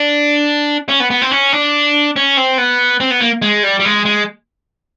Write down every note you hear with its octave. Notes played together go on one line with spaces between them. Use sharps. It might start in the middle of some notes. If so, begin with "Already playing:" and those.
Already playing: D4
C#4
B3
B3
C4
C#4
D4
C#4
C4
B3
C4
B3
A#3
G#3
G3
G3
G#3
G#3